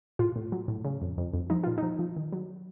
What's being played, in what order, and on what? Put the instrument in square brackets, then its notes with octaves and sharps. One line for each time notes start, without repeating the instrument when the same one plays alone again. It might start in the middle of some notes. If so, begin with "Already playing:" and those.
[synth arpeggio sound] A2 F4
A2
F#3
A2
C#3
F2
F2
F2
F3 D#4
A#2 F4
F3 D#4
F3
D#3
F#3